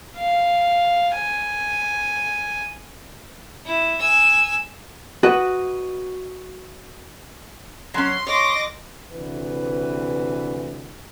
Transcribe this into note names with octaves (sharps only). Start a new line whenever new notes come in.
F5
G#5
E4
G#5 E6
F#4 B4 D#5
F#3 C#4 C6
C#5 D#5 D6 A#6
D2 C3 E3 B4